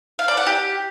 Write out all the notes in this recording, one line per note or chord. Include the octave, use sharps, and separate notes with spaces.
F5
D5
F#5
G4